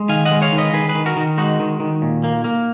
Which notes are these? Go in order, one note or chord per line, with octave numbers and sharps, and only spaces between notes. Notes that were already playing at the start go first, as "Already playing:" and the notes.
Already playing: G#3
D#3 F5 G#5
D#5 F#5
G#3
C#5 F5
D#3
B4 D#5
D#3 G#4 B4
G#4 B4
D#3
F#4 A#4
D#3
G#3 D#4 F#4
D#3
D#3
A#2
A#3
A#3